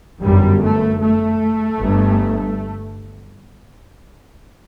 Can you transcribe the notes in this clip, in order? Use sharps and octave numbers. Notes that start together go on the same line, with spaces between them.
G1 F#2 G3
A3
A3
G1 G2